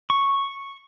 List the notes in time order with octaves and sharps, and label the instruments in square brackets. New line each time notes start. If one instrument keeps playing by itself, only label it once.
[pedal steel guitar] C#6